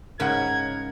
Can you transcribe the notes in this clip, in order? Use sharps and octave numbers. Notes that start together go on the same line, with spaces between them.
G#2 C#3 A#4 F#5 B5 G#6